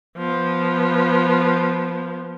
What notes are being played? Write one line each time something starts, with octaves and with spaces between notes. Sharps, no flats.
F3 B3